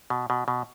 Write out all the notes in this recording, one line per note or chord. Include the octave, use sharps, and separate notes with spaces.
B2
B2
B2